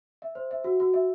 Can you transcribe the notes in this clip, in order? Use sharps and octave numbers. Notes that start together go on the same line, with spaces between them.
E5
C5
E5
F#4
F#4
E5